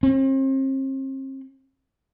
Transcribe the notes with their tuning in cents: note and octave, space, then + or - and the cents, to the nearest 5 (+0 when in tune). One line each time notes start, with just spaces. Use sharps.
C4 +40